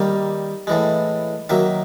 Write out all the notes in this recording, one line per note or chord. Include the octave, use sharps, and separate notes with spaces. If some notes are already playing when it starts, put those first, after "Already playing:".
Already playing: D#3 G3 A#3 F5
A2 E3 G#3
D#3 F#3 A#3 E5